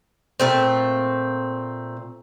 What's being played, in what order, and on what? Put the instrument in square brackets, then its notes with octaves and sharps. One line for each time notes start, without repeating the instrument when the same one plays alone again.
[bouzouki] A#2 A3 C4